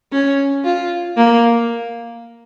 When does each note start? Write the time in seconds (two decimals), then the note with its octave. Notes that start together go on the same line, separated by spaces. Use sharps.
0.13 C#4
0.64 F4
1.17 A#3